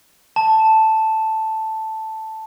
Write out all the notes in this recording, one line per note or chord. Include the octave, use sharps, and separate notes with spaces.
A5